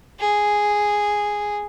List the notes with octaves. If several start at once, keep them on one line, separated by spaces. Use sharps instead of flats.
G#4